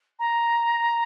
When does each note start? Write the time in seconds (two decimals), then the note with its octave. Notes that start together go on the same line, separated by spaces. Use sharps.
0.19 A#5